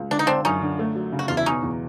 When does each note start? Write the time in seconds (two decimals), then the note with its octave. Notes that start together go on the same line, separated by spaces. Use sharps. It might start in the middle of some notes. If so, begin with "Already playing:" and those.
Already playing: C#2
0.11 D3 D4
0.19 D#4
0.27 D3 C4 D4
0.45 F#2 C#4 D#4
0.61 D3
0.79 A3
0.95 F#3
1.12 C#3
1.19 F#4
1.28 E2 F4
1.37 E4
1.46 B2 C#4 D#4
1.63 E2